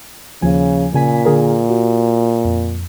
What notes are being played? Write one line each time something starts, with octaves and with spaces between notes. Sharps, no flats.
D#2 C#3 F3 G#5
A#2 C#3 G#5 B6
D3 G#4 A#4
F#4
F2